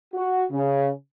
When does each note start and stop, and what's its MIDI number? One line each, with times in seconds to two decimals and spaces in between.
0.14 0.44 66
0.52 0.89 49